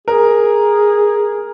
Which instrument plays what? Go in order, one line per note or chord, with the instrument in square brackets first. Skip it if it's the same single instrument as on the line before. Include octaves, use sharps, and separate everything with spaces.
[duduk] G#4 [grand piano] A#4